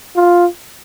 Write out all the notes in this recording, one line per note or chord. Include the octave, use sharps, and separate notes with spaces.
F4